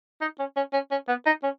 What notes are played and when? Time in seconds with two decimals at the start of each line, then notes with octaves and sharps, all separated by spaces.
0.21 D#4
0.39 C#4
0.56 C#4
0.73 C#4
0.91 C#4
1.08 B3
1.26 D#4
1.43 C#4